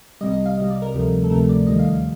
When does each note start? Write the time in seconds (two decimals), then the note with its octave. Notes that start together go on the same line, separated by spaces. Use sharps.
0.21 C2 C3 G3 D#5
0.34 D#5
0.46 F5
0.58 C2 C3 G3 D#5
0.70 D5
0.82 A#4
0.94 D2 C3 F3 A3
1.24 A4
1.30 D2 C3 F3 A3 A#4
1.49 D5
1.67 D#2 D#3 G3 D#5
1.79 F5
1.92 F5